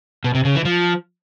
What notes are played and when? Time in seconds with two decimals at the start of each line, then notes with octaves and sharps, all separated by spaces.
0.24 B2
0.35 C3
0.45 C#3
0.55 E3
0.65 F3